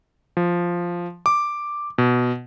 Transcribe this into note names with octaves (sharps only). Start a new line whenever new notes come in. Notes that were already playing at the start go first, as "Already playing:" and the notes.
F3
D6
B2